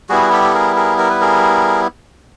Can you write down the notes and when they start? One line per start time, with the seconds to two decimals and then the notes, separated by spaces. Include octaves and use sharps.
0.09 G3 B3 E4 F#4 G#4
0.32 G4 A4
0.44 A4
0.54 G#4 A#4
0.76 G#4 A#4
0.98 A#4
1.10 B4
1.21 G#4 A#4